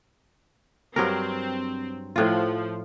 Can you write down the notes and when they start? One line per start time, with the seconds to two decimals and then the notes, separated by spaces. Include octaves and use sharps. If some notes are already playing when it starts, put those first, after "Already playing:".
0.96 G2 F#3 C4 A#4
2.16 A2 F3 F4